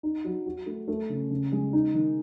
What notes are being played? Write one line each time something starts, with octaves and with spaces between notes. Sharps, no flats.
D#4
F#3
F#4
A3
A3
C#3
C#3
G#3
D#4
D#3